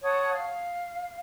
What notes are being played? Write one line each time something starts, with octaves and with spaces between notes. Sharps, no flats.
C#5 F#5 A5 D#6
F5